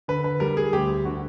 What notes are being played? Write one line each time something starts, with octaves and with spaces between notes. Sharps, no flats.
D3 B4
B4
G3 A#4
G#4
D2 G4
D3 F#4